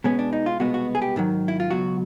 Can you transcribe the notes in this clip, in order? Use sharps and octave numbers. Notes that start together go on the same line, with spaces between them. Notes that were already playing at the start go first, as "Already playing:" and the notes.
B2 G#3 B3 C#4
D4
D#4
F4
C2 B2 G#3 B3 F#4
F#4
G#4
G4
G#2 D#3 F#3
E4
F4
C#2 B2 F#3 F#4